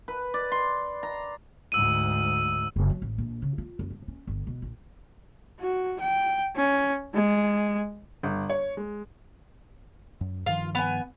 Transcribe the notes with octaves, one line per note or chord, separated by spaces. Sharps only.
B4
D5
C6
A#5
D2 G#2 E6 D#7
F#1
F#3
A1
A#1
C#3
F4
F#2
G2
C#4
G1
B2
A#1
F#4
G5
C#4
G#3
G1
C#5
G#3
F#2
G2 D#3 F3 F4
B3 G#5